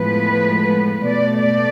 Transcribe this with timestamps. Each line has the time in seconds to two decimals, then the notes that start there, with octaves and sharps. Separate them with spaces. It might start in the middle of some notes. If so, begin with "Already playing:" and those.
Already playing: A2 F3 G#3 B3 B4
1.05 B2 A3 D5
1.38 D5